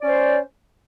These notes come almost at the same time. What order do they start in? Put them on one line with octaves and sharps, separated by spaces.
D5 C#4 C5